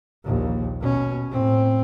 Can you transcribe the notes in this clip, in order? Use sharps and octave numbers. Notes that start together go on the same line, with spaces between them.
A#1 D#2
B2 C#4
A2 C4